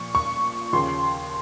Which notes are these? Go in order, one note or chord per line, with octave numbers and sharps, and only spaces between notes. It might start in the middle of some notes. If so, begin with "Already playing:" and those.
Already playing: A#2 F3 C#6
C#6
D#2 C#3 F3 C6